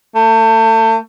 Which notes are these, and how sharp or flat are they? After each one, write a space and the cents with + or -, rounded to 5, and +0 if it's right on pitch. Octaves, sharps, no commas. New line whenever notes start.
A3 +30